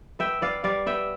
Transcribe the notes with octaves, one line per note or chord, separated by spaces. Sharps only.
B3 E5 G5
B3 D5 F5
G3 D5 F5
B3 E5 G5